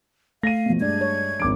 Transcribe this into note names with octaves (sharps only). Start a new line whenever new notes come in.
A3 F5 A#6 D#7
B2 F3
G2 G#3 D4 D5 G#6
C#5
G#1 F3 D4 D6 D7